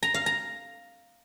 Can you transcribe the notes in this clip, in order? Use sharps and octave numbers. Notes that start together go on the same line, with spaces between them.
A#5
F5
A#5